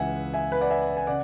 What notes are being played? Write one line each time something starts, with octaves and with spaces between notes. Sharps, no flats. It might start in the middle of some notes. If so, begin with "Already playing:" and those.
Already playing: C#2 C#3 E3 E5 F#5 G#5
E5 G#5
B4
D5 F#5
E5 G#5
G#5
C#3 D5 F#5